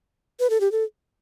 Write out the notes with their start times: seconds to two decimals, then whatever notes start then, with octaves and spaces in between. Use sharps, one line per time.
0.40 B4
0.50 A4
0.61 G4
0.72 A4